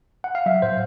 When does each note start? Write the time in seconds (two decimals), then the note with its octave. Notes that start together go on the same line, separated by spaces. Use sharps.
0.24 F#5
0.35 F5
0.46 F#3 E5
0.62 A2 C5